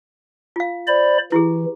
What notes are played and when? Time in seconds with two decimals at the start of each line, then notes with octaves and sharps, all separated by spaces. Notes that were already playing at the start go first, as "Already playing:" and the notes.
0.56 F4 F5
0.88 C5 D5 B5
1.32 E3 E4 G4 G#4